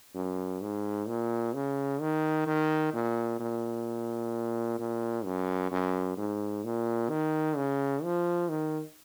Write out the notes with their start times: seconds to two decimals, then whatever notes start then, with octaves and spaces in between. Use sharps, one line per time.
0.15 F#2
0.62 G#2
1.08 A#2
1.54 C#3
2.01 D#3
2.47 D#3
2.94 A#2
3.40 A#2
4.79 A#2
5.25 F#2
5.71 F#2
6.17 G#2
6.65 A#2
7.10 D#3
7.57 C#3
8.03 F3
8.49 D#3